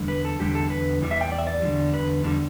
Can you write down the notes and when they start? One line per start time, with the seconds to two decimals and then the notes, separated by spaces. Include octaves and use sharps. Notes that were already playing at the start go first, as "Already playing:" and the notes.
Already playing: E2 D3 G3
0.08 B4
0.25 A4
0.39 E2 D3 G3 G4
0.55 A4
0.70 B4
1.02 E2 E3 G3
1.11 E5
1.21 G5
1.32 D5
1.38 E5
1.47 D5
1.62 E2 D3 G3
1.94 B4
2.24 E2 D3 G3